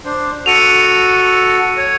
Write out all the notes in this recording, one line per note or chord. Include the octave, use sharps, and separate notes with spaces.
D4 C5
F#4 A4 C#7 D#7 F7
C#5